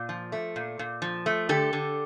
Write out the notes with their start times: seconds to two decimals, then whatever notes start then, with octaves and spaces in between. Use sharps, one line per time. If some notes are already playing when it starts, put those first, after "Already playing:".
Already playing: A#2
0.09 F3
0.32 A3
0.56 A#2
0.79 A#2
1.02 F3
1.26 A3
1.49 D3 G4 A4
1.73 D3